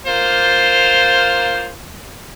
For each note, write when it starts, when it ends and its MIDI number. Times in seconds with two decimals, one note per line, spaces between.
0.06 1.70 58
0.06 1.70 65
0.06 1.70 72